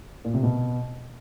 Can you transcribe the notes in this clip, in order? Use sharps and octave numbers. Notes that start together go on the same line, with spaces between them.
A#2
C3
B2